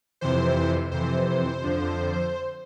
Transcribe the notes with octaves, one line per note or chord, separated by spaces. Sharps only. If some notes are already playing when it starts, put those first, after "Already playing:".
F2 C3 E3 C5
F2 C3 E3 C5
F2 D3 F3